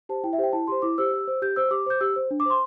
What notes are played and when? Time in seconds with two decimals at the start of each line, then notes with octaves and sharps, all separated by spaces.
0.09 G4 C5 A5
0.24 E4 G5
0.33 E5
0.38 G4 C5 G5
0.53 E4 A5
0.67 G4 C5 C6
0.82 E4 D6
0.98 G4 C5 E6
1.12 G4
1.28 C5
1.42 G4 G6
1.56 C5 E6
1.71 G4 D6
1.86 C5 G6
2.01 G4 E6
2.16 C5
2.31 D4
2.40 D6
2.46 C5 C6